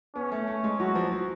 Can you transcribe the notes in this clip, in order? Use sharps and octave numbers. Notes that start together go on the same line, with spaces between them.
B3 C#4
A3
A3
G#3
F#3 F#4
F3
F#3